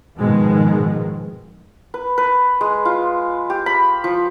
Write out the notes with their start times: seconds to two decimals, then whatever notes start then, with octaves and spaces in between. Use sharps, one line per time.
0.18 G#2 B2 D#3 F3 G#3
1.94 B4
2.18 B4
2.61 G#3
2.85 F4
3.50 G4
3.66 B5
4.04 F3